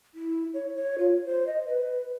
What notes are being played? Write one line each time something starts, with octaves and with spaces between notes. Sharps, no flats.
E4
C#5
C#5
F4
C5
D#5
B4